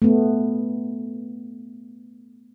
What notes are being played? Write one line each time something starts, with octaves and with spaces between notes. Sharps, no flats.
A3 B3